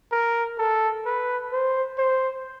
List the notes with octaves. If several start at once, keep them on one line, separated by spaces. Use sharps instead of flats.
A#4
A4
B4
C5
C5